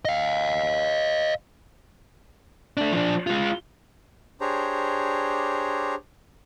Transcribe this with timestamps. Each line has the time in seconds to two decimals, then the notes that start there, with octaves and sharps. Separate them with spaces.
0.05 D#5 F5
2.77 A3 D4
2.92 F3 D4
3.27 G#3 F4
4.41 D4 G4 G#4 C5 C#5 A#5